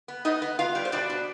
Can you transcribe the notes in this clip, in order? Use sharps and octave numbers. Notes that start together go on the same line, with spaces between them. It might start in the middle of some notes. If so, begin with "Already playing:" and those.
B3
B3 D#4 D#5
B3
B3 F4 F5
G3
C5
B2 D4 D5
B2